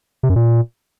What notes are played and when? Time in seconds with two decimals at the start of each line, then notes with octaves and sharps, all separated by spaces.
0.23 C3
0.30 F#2
0.36 A#2